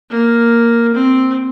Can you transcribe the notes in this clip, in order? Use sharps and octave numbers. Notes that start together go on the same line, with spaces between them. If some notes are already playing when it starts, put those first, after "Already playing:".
A#3
C4